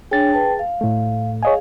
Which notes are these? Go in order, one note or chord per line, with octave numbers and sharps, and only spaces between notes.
D4 G#4 C#5 G5 A6
B4 G5 A5
F5
A2 A3
G#4 C#5 D#5 F5 G#5